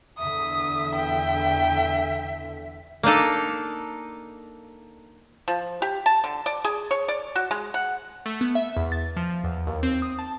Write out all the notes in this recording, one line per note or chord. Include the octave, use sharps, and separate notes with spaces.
E2 D3 E5 D#6
G5
A#3 D4 D#4 A4
F3
G4
A5
D3
D5
G#4
C#5
D5
F#4
G#3
F#5
A3
B3
E5
E2
A6
F3
E2
D#2
C4
D#6
A5